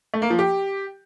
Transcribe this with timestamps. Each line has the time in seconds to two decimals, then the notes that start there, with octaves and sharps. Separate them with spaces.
0.14 A3
0.22 A#3
0.30 F3
0.39 G4